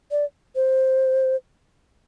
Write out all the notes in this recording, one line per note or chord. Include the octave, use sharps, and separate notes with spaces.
D5
C5